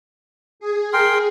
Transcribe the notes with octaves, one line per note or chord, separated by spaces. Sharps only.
G#4
A#4 G5 C6